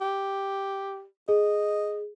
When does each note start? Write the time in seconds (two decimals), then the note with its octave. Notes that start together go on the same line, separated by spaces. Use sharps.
0.01 G4
1.29 G#4 D#5